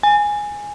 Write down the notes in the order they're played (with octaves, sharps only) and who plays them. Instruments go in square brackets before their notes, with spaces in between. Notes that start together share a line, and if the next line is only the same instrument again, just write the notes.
[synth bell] G#5